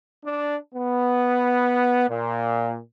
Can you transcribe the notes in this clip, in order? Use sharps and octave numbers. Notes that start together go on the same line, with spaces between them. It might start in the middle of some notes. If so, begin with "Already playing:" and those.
D4
B3
A#2